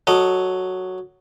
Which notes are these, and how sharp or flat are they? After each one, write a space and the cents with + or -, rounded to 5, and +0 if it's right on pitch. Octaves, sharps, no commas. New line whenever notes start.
F#3 +0 A4 +5 D#5 -10